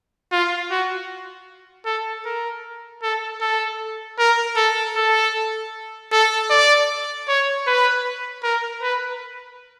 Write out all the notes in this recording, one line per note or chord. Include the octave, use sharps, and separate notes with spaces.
F4
F#4
A4
A#4
A4
A4
A#4
A4
A4
A4
D5
C#5
B4
A#4
B4